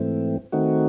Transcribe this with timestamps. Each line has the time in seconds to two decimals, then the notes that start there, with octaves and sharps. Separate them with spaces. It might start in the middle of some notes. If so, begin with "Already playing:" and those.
Already playing: G#2 E3 A3 C4
0.52 D#3 A3 C4 D#4 F#4